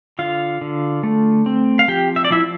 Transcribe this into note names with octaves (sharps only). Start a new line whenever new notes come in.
D3 F4 F5
D3
A3
C4
F5
F3 G4 G5
E5
D5
F3 E4 E5